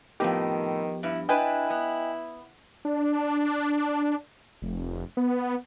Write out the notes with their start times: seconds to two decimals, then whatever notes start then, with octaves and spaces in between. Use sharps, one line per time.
0.20 F2 A2 D#3 F3 B3 G4
1.03 G2 E4
1.29 D4 E4 B4 D#5 G5 G#5
1.70 B3
2.85 D4
4.62 F1
5.17 B3